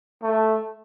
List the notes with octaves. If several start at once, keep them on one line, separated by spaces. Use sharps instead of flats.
A3